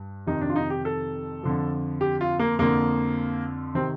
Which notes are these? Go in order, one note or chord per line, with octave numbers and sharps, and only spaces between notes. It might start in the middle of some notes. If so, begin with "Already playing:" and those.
Already playing: G2
F2 C3 D#3 D#4
D4
F4
D#4
G4
A4
F2 D3 F3
G4
F4
A#3
F2 D3 F3 A#3
C3 D#3 C4